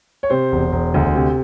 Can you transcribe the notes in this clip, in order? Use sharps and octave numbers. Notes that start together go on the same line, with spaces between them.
C#5
C3 C5
E1
E1
D2
C3